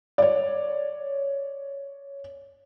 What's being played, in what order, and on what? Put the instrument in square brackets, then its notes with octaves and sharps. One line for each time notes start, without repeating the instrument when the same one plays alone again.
[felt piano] C#5 D5